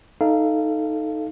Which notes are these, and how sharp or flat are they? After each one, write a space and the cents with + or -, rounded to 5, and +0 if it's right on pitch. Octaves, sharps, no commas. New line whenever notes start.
D#4 +0 A4 +0 F5 -20